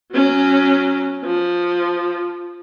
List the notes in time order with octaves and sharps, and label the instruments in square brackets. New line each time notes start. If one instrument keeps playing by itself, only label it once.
[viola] F#3 C#4
F3